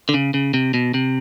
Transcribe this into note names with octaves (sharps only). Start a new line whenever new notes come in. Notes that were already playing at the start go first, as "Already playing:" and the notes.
D3
C#3
C#3
C3
B2
C3